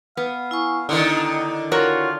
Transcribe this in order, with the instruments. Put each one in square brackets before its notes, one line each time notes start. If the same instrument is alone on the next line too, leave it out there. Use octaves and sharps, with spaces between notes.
[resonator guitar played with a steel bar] B3 [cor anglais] F5
[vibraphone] E4 G#5 C#6
[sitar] D3 D#3 [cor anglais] D#4 [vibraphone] E4
[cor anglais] F4 [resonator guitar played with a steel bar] F#4 A#4 C#5